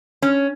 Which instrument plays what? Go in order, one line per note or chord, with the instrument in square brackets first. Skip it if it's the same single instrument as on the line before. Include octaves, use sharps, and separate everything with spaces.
[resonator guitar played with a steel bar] C#4